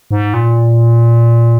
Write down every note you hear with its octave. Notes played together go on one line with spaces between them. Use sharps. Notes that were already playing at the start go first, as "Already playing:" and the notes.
G#2
A#2